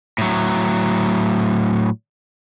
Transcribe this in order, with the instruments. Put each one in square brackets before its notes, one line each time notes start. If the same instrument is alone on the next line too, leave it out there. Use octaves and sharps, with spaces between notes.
[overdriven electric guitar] A2 F#3